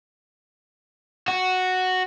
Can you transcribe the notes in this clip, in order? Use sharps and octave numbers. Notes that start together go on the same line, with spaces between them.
F#4